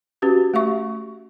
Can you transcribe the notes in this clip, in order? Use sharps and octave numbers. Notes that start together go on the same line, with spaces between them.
C#4 F#4 G4 B4
A3 G4 E5 C#6